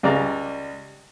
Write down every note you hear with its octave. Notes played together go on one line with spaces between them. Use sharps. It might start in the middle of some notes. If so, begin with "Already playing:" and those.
C#2 G3 D5 F5 A#5